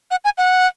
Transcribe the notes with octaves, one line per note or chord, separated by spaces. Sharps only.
F#5
G#5
F#5